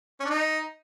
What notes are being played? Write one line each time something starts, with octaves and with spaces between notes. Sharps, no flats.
C#4
D4
D#4